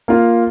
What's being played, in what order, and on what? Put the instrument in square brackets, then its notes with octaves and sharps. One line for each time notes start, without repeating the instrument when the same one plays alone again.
[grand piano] A#3 F4